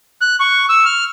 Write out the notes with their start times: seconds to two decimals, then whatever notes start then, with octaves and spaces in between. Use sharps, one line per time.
0.21 F#6
0.40 C#6
0.69 E6
0.85 F6